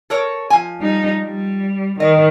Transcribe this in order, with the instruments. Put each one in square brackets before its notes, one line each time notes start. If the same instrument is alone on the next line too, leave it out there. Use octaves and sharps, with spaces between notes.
[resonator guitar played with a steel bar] A4 A#4 C#5
F3 G#5
[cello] G3 D#4
G3
[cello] D#3 [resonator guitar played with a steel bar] D#5